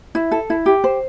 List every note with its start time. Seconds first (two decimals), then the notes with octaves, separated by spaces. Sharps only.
0.15 E4
0.31 A4
0.50 E4
0.66 G4
0.84 C5